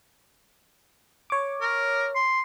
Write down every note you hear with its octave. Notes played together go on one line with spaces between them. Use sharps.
C#5 D6
A#4
C6